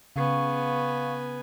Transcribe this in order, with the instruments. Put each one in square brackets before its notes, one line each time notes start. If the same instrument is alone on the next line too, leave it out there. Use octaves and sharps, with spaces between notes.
[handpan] C#3 [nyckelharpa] B3 G#5 [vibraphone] F5 C#6